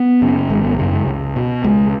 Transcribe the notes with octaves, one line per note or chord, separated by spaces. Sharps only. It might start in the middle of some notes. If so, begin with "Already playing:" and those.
Already playing: B3
F#2 C#3
G#1 G#3
B3
F#2 C#3 B3
G#3
C#2
B2
C#2 G#3